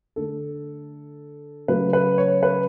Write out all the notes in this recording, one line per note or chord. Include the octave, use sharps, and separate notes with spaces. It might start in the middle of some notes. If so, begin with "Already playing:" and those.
D3 A3 A4
C#3 F#3 A3 B4
B4
C#5
B4